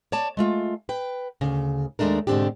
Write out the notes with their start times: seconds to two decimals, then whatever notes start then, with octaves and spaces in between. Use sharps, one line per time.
0.12 C#5 D5 A5
0.37 G#3 A3 F4
0.89 B4 G5
1.41 D2 C#3
1.99 D#2 G#3 A3 D4 A#4
2.27 G#2 B2 D3 C4 D4 G4